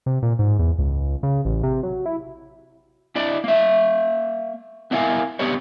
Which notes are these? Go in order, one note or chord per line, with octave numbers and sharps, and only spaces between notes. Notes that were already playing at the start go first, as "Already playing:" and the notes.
C3
A#2
G#2
E2
C#2
C#3
A1
C3
F#3
E4
D4 E4 D5
A#3 E5
B3 D4 E4 A#4 F5 G#5
B3 D4 G4 B4 C#5